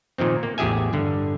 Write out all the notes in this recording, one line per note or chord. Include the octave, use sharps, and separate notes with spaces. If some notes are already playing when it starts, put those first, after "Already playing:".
A#2 D#3 F3 C4
A#3
A1 E2 G4 G#4 E5 G#5
G2 D3